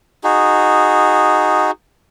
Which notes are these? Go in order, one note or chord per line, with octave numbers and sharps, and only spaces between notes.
D#4 F#4 G#4